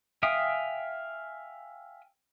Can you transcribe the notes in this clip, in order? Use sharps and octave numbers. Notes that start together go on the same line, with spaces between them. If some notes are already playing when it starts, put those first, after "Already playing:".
E5 F5 G5 G#5 D#6